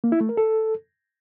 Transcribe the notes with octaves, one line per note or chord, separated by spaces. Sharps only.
A#3
E4
A3
A#4
A4